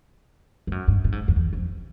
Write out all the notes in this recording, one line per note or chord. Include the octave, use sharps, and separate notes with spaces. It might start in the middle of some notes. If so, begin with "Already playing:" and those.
G2
F#2
G2
A2
G#2
F2
E2
F2